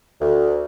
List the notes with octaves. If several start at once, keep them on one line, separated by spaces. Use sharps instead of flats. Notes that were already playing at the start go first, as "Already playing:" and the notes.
D2